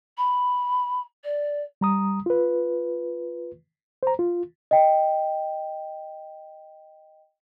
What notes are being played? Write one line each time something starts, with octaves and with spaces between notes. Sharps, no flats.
B5
D5
G3 A#5 D#6
F4 B4
C5 A#5
F4
D#5 G5